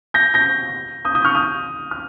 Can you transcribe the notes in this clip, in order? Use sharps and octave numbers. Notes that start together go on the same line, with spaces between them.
G6 A#6
G6 A#6
D#6 G6
D#6 G6
C#6 F6
D#6 G6
F6